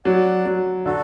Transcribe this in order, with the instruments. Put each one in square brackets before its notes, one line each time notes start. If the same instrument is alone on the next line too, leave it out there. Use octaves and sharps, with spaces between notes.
[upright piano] F#3 [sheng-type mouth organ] D5 F#5
[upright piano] F#3
[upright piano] D3 [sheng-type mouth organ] F#4 A4